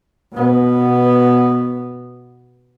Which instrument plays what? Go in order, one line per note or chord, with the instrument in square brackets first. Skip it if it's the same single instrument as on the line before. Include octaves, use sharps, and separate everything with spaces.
[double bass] B2 B3